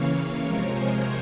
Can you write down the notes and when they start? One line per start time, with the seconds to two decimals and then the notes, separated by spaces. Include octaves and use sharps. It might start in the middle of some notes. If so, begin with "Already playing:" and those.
Already playing: C#3 E3 A#3 C#5 F5
0.16 C#5 F5
0.44 C3 F3 G#3 A#4 C#5
0.73 G#4 C5